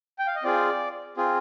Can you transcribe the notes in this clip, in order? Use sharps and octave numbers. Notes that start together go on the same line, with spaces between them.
G5
F5
D#5
C4 F4 G#4 D5
C4 F4 G#4